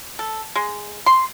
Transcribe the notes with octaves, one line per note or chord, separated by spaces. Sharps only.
A4
G#3
C6